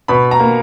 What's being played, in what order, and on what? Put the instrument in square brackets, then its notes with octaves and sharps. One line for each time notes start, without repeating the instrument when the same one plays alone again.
[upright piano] B2 [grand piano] B5
[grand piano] A#5
[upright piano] A#3